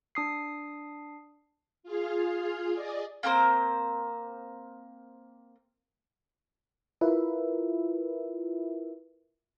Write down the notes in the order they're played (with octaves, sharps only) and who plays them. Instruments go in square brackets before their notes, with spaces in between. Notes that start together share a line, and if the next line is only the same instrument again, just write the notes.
[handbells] D4 D#6 C7
[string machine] F4 G#4 F5
G#4 D5 D#5
[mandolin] A#3 C4 A#4 C5
[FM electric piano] E4 F4 A#4 B4 E5